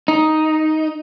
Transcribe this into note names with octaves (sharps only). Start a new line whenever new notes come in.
D#4